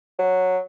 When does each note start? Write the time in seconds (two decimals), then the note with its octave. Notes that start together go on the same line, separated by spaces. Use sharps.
0.19 F#3